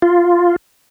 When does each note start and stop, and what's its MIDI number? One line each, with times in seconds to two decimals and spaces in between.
0.02 0.56 65